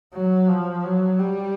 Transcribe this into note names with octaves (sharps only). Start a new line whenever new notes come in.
F#3
F3
F#3
G3